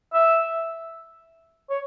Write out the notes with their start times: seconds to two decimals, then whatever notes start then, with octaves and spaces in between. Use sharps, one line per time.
0.14 E5
1.70 C#5